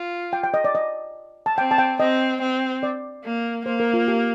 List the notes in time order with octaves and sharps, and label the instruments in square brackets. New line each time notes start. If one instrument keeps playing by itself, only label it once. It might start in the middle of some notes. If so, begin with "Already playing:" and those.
Already playing: [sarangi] F4
[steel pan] G5
G5
D#5
D5
D#5
A5
[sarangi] C4 [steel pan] G5
[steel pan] A5
G5
[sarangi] C4 [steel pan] D#5
[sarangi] C4
[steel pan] D5
[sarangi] A#3
[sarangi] A#3 [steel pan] C5
[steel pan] A#4
F4
G4